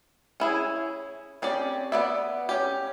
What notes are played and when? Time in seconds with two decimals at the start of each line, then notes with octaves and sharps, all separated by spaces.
0.40 C#4 E4 G#4
1.42 C4 C#4 G4 D5
1.92 B3 D5 E5
2.49 C#4 G4